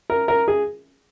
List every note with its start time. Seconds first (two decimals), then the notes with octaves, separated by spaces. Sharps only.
0.10 A#4
0.28 A#4
0.48 G#4